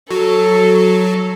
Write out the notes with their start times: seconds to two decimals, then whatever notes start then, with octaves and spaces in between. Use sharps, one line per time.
0.11 F#3 A4